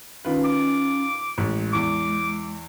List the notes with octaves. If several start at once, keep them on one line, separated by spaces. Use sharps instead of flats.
D#3 C#4 F4 B4
D6
A1 G#3
E2 C#6 D6